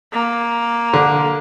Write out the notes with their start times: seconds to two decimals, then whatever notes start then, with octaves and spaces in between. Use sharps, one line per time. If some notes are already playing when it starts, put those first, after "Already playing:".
0.13 A#3
0.93 D3